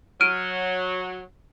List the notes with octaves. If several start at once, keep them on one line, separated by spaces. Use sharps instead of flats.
F#3 F6 D7 D#7